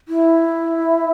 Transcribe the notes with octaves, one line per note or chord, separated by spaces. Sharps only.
E4